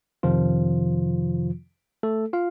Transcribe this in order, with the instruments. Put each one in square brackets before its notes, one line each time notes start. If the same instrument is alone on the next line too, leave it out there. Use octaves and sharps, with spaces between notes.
[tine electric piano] F2 C3 D#3 F3 F4
A3 A4
F4 F5